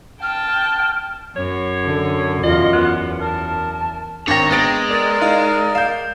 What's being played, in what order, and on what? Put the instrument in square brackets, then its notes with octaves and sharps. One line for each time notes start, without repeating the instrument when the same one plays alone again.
[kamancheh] G5 A5 [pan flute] F6
[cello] F#2 [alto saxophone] C#5
[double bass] D3
[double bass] E2 [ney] F4 [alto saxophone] D#5
[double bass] E2 [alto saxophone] B3
[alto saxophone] A#4 [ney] A5
[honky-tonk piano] G#1 A#6 [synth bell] D4 G5 [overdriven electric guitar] C#5 [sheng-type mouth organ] A#5
[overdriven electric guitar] G#3 [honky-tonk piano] B3 A6 D7
[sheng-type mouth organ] A#4 D5
[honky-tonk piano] D#4 [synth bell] F5 F6
[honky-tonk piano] F5 G6 [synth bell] E7